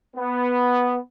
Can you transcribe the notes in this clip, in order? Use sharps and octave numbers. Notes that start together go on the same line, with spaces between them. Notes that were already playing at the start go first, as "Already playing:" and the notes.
B3